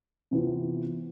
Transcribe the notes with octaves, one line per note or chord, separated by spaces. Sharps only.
C3 E3 B3 F4